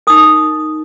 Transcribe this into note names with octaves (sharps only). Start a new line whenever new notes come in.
D#4 A#4 D#6